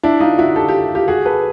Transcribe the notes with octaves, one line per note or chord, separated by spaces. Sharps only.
D4 E4
D#4 F4
E4 F#4
G4 A4
F4 G4
F4 G4
F#4 G#4
A4 B4